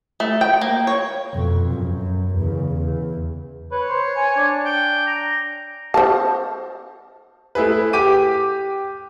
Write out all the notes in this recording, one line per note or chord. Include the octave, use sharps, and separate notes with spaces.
A3
G5
A#3
C#5
F2 B2
F#2
E2 C#3
E2
B4 C#5
C5
G#5
D4
G5
A#5
C5 A5
A3 E4 G#4 B4
G4 D6 D#7